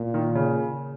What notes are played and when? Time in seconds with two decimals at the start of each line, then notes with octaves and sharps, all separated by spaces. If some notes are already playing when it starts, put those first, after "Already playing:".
Already playing: A#2
0.14 D#3
0.35 C#3